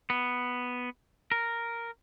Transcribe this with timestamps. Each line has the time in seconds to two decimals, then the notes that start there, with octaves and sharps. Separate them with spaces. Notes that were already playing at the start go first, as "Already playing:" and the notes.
0.10 B3
1.32 A#4